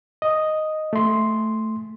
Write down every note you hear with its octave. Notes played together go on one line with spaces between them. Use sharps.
D#5
A3 C6